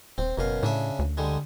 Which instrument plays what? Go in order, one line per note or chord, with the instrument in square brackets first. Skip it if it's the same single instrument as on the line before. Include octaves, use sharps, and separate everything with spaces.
[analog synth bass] D#1 [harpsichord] C4
[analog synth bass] F#1 [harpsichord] F#2 B2 F5
[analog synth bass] A2 [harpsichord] C#3 D4 E5
[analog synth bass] D2
[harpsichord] D3 G3 G#3